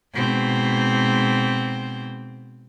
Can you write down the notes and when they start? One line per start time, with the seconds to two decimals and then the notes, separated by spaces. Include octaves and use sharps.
0.14 G#2 B2 C4